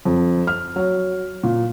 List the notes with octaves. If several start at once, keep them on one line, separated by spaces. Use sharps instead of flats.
F2
F6
F#3
A#2